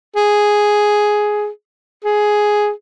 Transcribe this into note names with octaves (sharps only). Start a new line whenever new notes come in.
G#4
G#4